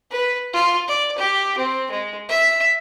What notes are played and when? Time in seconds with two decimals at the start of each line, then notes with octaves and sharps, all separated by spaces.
0.11 B4
0.53 F4
0.88 D5
1.18 G4
1.57 C4
1.91 G#3
2.29 E5